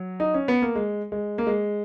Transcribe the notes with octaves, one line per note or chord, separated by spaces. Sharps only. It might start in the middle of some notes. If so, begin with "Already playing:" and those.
Already playing: F#3
D#4
C#4
B3
A#3
G#3
G#3
A#3
G#3